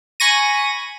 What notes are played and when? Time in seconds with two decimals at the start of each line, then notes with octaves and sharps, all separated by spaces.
0.20 G#5 B5 C#6 A#6 D#7